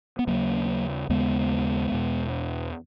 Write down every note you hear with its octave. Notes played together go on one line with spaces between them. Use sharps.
B3
D#2 C#3 F#3 A#3
D#2 C#3 G#3 B3
E2 B2